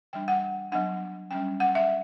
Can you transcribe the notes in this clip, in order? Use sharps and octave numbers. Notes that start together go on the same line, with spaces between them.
E3 G3 D4 G5
F#5
F#3 B3 D4 F#5
G3 C#4 G5
F#5
E5